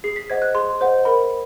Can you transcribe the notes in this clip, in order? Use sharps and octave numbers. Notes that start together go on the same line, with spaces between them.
G#4 C7
B6
C5 D#5 F#5 G#6
F#6
G#4 C6
C5 D#5 F#5
A#4 B5